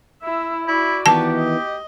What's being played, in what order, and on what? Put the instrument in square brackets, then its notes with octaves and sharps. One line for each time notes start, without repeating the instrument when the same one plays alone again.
[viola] E4 E5
[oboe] E4 [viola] F#4 D5
[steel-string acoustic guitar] D#3 E3 B3 [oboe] G4 [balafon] A5
[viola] D#5